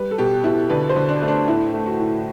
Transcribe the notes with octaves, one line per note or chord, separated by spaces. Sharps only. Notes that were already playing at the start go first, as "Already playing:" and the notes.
Already playing: G3 B4
A4
B2 G4
B2 E4
D3 B4
C5
D3
D4
A3
D4
A2 E4
A3
F#4
A2